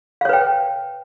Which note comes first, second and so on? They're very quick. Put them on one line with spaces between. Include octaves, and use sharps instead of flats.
F5 C#5 B4 G5